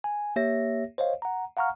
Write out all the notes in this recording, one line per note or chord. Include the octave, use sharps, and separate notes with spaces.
G#5
A#3 G4 C#5 E5 A#6
C5 C#5 D#5 F5
F#5 A#5
F5 F#5 A#5 C#6 F6